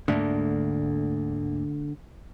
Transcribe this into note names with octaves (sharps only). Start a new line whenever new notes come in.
D2 G#2 D3 A3 A#3